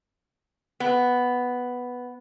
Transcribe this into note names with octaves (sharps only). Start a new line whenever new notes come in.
B3